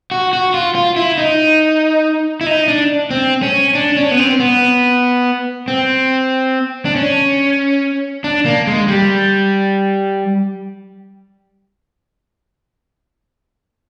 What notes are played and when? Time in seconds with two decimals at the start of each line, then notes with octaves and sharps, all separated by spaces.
0.11 F#4
0.33 F#4
0.54 F4
0.75 F4
0.96 E4
1.18 D#4
2.41 E4
2.46 D#4
2.68 D4
3.11 C4
3.43 C#4
3.75 D4
3.97 C#4
4.11 B3
4.18 C4
4.40 B3
5.68 C4
6.85 D4
6.96 C#4
8.24 D4
8.45 A#3
8.67 G#3
8.88 G3